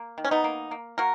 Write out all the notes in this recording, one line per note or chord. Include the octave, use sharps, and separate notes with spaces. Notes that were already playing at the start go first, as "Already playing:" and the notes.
Already playing: A#3
D#3
C#4
B3 D#4
A#3
A#3
A#3 F#4 A#4